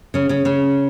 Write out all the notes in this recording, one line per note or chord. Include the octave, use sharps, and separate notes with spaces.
C#3 C#4
C#3 C#4
C#3 C#4